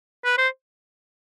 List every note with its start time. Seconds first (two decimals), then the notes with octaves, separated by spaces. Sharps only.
0.24 B4
0.38 C5